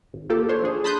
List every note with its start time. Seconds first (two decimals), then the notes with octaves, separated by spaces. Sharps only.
0.13 G#1
0.30 A#3 F4 G4 A4
0.49 D4 C5 C#5
0.62 F3 D4 G#4
0.84 A5 B5 C6 D#6 F#6 G6